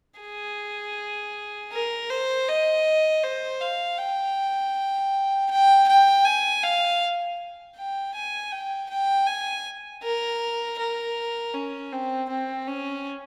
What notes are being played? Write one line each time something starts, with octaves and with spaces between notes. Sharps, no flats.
G#4
A#4
C5
D#5
C5
F5
G5
G5
G5
G#5
F5
G5
G#5
G5
G5
G#5
A#4
A#4
C#4
C4
C4
C#4